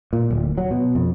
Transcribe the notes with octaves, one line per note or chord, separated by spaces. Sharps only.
A#2
D1
F#3
B2
F2